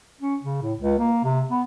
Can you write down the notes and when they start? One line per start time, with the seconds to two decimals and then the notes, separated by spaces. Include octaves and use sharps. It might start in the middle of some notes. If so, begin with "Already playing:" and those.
0.21 C#4
0.43 C#3
0.62 A2
0.79 C#2
0.99 A#3
1.24 C3
1.50 B3